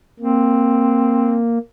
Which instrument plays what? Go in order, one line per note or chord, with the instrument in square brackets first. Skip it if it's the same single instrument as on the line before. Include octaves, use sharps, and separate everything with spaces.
[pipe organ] A#3 [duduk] C4